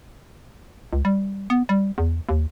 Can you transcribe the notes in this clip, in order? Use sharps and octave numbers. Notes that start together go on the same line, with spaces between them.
C#2
G3
B3
G3
E2
D#2